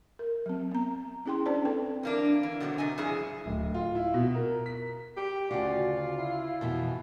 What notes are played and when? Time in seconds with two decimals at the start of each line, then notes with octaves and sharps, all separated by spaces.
0.19 A#4
0.46 F#3 C4
0.71 B3 A#5
1.26 C#4 E4 G#4 G5 C6
1.46 C#4 D4 C5 D5 A5
1.65 C4 A4 B4 G5
2.03 E3 A#3 D4
2.43 E3
2.60 B2 D3 F#3 B3 C4
2.78 C3 D#5 G#5
2.98 G2 F3 E4 G#4
3.46 D1
3.74 F4
3.95 E4
4.14 B2
4.34 A#4
4.66 B6
5.17 G4
5.51 D2 C#3 F4 F#4 D5
6.17 E4
6.61 F2 B2 E3